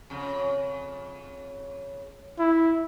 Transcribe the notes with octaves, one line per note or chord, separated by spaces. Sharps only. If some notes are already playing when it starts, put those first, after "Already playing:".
F2 C#3
E4